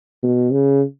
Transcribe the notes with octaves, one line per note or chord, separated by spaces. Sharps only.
B2
C#3